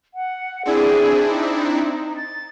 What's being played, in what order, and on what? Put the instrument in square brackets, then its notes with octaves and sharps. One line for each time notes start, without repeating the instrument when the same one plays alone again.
[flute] F#5
[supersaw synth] C4 D4 E4 [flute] G#4
[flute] D#4
A6